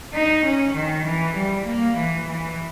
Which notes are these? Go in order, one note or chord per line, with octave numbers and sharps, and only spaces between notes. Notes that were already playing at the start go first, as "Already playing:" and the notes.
D#4
C#4
D#3
E3
G3
A#3
E3
E3